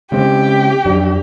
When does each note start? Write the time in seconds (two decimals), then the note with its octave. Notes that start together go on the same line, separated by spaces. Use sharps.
0.12 C#3 G#3 C4 G4
0.85 F2 F#3 D4